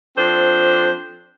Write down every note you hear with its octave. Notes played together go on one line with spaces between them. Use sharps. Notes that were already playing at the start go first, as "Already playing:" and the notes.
F3 C4 D4 A4 C5